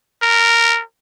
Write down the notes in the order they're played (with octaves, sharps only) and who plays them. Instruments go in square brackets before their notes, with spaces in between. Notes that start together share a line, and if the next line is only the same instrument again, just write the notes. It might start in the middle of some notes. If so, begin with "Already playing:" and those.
[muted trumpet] A#4